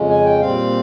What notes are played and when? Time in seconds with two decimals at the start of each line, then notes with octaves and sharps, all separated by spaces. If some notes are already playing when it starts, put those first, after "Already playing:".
Already playing: F2 C#3 G#3 C#4
0.09 G#5
0.24 G5
0.40 A#2 G3 C4 F5